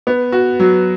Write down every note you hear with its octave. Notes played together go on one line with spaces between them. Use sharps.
B3
F#4
F#3